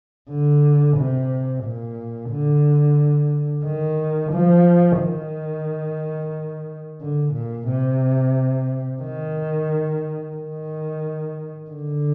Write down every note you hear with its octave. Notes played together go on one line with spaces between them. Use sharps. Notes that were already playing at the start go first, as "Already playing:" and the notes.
D3
C3
A#2
D3
D#3
F3
D#3
D3
A#2
C3
D#3
D#3
D3